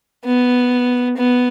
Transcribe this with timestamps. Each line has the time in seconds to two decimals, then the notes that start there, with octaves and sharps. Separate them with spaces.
0.25 B3
1.17 B3